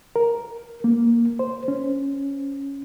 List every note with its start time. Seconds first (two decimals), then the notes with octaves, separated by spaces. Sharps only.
0.16 A#4
0.84 A#3
1.39 C5
1.68 C#4